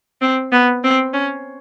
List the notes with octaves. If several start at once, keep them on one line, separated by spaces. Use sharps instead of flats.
C4
B3
C4
C#4